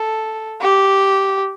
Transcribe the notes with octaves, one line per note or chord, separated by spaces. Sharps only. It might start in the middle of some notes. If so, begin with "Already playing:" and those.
Already playing: A4
G4